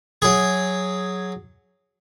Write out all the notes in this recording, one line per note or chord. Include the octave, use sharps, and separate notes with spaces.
F#3 G#4